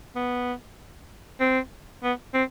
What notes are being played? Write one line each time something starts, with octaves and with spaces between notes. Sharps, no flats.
B3
C4
B3
C4